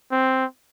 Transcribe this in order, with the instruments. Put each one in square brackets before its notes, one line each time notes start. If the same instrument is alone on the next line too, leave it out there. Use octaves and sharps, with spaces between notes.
[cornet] C4